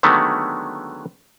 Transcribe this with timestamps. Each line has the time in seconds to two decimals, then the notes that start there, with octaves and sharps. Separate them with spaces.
0.03 D3 D#3 F#3 G#3 A3 B3